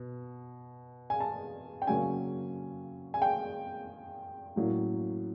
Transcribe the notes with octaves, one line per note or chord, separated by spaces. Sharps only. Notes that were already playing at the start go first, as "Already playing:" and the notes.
Already playing: B2
G#5
A5
G5
C#3 F#3 A#3 C#4 G#5
G#5
G5
A2 F#3 A#3 C#4